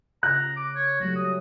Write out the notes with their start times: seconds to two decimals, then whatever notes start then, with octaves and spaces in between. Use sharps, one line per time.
0.23 C#3 A#5 F#6
0.57 D6
0.75 C#5
1.00 F#3 G3 A3 F#4
1.16 D#6